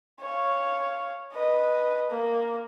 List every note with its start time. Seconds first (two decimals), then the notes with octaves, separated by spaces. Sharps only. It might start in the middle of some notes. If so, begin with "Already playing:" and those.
0.21 C#5 F5
1.33 B4 D#5
2.10 A#3